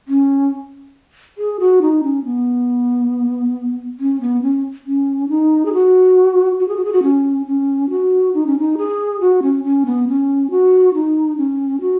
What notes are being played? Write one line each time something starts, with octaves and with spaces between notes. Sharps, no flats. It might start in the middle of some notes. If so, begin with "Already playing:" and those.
C#4
G#4
F#4
D#4
C#4
B3
C#4
B3
C#4
C#4
D#4
G#4
F#4
F#4
G#4
F#4
G#4
F#4
C#4
C#4
F#4
D#4
C#4
D#4
G#4
F#4
C#4
C#4
B3
C#4
F#4
D#4
C#4
F#4